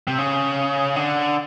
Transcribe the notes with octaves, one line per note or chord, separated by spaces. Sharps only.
C3
C#3
D3